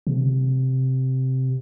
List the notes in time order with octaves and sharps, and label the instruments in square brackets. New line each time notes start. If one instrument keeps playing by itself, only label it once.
[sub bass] C3